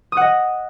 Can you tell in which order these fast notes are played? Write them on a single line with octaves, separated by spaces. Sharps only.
D#6 F#5 D#5